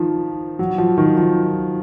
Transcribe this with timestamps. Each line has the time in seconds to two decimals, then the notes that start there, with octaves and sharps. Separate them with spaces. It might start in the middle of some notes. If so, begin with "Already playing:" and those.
Already playing: D#3 F3
0.59 F#3
0.78 F3
0.98 D#3
1.17 F3